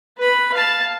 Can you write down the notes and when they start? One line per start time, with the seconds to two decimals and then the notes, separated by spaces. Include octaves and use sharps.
0.18 B4 B5
0.54 F5 A5